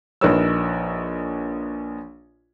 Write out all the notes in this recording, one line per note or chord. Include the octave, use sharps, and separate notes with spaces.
A#1 D#4 A#4 B4 C#5 E6